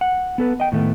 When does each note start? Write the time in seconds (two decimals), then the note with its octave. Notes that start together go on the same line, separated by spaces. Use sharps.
0.01 F#5
0.38 B3 A4 B4
0.60 D#5 G5
0.72 A2 D#3 A3 B3